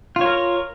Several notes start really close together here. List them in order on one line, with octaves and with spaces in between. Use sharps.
F4 C#5 A#4